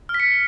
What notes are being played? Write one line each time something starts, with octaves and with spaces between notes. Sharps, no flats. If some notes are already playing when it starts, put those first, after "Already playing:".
F6
B6
C#7